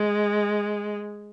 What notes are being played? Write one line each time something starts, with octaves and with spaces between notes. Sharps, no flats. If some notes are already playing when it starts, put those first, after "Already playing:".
Already playing: G#3